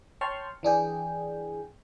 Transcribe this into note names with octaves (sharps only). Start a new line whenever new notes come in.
C#5 G5 A5 C6 C#6 F6
E3 D4 G#4 G5